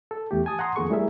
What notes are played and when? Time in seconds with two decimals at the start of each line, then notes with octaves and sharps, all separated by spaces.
0.11 A4
0.31 E2 A3 G4
0.46 G#5 A5 D#6
0.59 F#5 A#5 C6 D#6
0.76 F2 D#3 A#3 G#4 A4 C#6
0.90 G3 A3 E4 G#4 A#4 E5